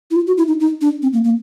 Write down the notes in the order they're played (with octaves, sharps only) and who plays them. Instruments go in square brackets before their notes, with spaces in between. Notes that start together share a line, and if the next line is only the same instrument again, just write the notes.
[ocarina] E4
F4
F#4
E4
D#4
D#4
D4
C4
A#3
A#3